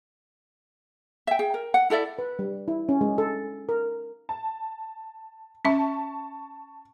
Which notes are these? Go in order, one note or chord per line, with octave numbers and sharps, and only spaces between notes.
E5 G5
G#4 G5
A#4
F#5
E4 A4 D5 E5
B4
G3
E4
C#4
G#3
A4
A#4
A5
C#4 E5 A5 C#6